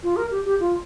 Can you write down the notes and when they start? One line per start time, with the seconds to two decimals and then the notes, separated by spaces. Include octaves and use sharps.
0.03 F4
0.16 A#4
0.30 G4
0.44 G4
0.60 F4